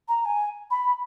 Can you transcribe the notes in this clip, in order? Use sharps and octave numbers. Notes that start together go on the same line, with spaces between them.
A#5
G#5
B5